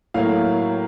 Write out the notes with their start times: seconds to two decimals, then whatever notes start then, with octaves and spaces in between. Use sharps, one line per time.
0.14 A2 F#3 A#3 F5